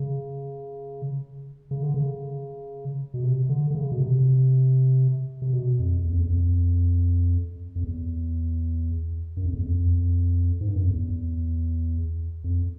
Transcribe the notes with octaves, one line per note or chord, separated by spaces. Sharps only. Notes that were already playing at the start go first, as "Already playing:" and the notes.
Already playing: C#3
C#3
D3
C#3
B2
C3
D3
D3
C#3
B2
C3
C3
B2
F2
E2
F2
E2
F2
F2
E2
F#2
F2
E2
F2
G#2
G2
F#2
F2
E2
F2